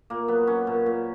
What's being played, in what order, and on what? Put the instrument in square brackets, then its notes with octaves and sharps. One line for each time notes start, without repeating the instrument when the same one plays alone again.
[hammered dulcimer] A#2 A#3
F#3 B3
F#3 C#4
A#2
A#2